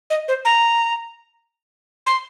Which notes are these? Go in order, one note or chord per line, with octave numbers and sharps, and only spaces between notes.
D#5
C5
A#5
C6